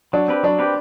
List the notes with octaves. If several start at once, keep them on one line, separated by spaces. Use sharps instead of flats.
F#3 D4
C4 G4 B4
F#3 D4
C4 G4 B4